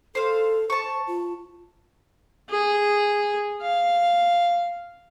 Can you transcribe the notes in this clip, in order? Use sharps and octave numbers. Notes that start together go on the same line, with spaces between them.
A4 C5 F5
C5 A5 C#6
F4
G#4
F5